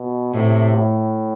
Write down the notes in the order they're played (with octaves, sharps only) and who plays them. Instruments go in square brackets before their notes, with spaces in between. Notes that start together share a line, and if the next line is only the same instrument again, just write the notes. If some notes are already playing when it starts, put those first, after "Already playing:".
Already playing: [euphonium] B2
[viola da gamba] A2 [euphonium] C3
[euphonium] A2